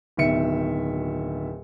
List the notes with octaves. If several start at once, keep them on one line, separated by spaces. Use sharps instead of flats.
D1 B2 D#3 E5 C#7